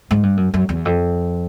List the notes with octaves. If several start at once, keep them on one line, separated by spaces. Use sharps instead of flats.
G#2
G2
F#2
F#2
E2
F2